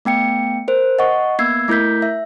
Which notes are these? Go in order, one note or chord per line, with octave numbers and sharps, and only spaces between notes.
A3 B3 G5 C#7
A#4 C5
D#5 F#5 C#6
A#3 B3 E6 G#6 C7
A3 E4 A#4 G6 B6
E5